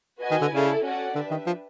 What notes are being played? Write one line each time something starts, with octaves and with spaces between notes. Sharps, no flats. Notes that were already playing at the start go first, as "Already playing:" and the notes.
F#4 B4 D#5 G#5
D#3
D3
C#3 E4 A4 D5
C#4 F#4 A4 D5 F#5
D3 D4 G4 B4 E5
D#3
F3